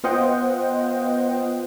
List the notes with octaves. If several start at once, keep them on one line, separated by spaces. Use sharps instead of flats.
B3 F4 C5 D#5 F#5 G5